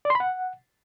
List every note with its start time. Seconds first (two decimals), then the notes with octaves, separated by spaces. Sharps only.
0.05 D5
0.10 C6
0.15 B5
0.20 F#5